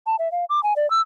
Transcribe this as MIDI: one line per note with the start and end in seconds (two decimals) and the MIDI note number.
0.07 0.16 81
0.19 0.31 76
0.32 0.45 77
0.50 0.63 86
0.63 0.73 80
0.76 0.89 74
0.90 1.01 88